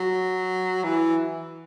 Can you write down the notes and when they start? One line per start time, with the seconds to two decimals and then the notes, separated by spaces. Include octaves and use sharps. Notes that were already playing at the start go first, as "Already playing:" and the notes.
Already playing: F#3
0.84 E3